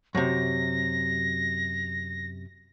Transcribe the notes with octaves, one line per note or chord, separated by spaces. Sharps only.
F#2 C3 A#6